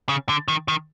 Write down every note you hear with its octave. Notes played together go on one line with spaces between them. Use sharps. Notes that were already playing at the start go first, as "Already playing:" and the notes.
C#3
D3
D#3
D#3